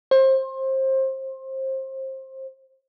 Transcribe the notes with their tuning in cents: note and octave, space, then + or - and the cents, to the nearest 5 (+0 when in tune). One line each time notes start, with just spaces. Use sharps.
C5 +25